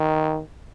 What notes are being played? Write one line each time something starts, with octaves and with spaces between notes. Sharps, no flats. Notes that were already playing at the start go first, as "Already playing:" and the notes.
Already playing: D#3